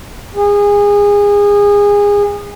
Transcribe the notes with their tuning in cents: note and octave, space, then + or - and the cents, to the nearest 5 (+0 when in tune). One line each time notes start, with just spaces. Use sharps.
G#4 -25